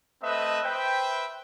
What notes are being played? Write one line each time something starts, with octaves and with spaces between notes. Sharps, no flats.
A3 C4 B4 D#5 E5
B4 C5 E5 G5